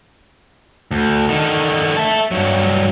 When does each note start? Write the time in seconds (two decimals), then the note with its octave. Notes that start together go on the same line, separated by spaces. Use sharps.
0.91 D2
1.29 D3 D#3
1.97 E5 A5
2.31 G2 F#3